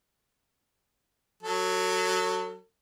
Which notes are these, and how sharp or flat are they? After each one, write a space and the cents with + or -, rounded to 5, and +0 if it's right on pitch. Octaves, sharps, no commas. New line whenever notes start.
F#3 +0 A4 +35